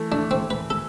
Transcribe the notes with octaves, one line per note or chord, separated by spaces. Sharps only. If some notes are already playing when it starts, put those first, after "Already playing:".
Already playing: E3 A3
A3 D4
C4
A3
B4
A4